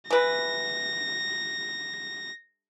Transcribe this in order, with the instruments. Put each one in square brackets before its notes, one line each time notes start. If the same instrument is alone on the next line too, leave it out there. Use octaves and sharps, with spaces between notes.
[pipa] E3 B4 [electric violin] A#6